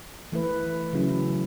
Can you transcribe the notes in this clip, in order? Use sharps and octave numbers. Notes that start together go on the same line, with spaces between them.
E3 A3 E4 B4
C#3 F#3 C#4 E4